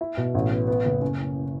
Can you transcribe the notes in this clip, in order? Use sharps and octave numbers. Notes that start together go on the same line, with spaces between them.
E4
B2
A1
B3
B3
F#1
C#4